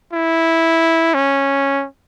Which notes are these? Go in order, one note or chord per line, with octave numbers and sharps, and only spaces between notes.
E4
C#4